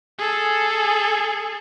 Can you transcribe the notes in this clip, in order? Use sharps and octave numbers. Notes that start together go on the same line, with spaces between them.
G#4 A4